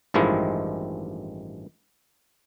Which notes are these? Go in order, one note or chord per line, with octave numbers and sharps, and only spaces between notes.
A1 G2 D#3 F3 G#3 E4